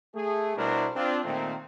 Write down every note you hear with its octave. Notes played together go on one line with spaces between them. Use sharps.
A3 G#4
B2 G3 D4 E4 A#4 C5
C4 D4 F4
A#2 D#3 A3 A#3 C4